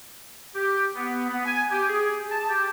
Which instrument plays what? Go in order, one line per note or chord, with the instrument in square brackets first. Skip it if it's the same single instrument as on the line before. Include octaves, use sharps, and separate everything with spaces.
[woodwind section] G4
B3
B3
G#5
G4
G#4
A5
G4